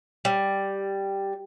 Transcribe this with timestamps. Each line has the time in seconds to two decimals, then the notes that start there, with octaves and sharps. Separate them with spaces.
0.25 G3